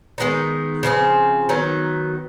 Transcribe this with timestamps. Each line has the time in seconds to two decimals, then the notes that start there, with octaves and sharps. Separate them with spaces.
0.18 D#3 G#3 B3 D#4
0.83 C#3 F3 A3 C4
1.49 D#3 F#3 B3 D#4